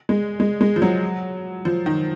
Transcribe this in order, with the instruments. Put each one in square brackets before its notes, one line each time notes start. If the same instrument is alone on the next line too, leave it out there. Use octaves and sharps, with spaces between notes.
[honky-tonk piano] G#3
G#3
G#3
F3
F#3
F3
D#3